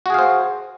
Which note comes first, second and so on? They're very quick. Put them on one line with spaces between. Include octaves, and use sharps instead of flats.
F#4 G#4 F5 C5